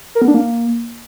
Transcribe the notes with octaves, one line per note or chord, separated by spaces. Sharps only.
A#4
B3
D4
A#3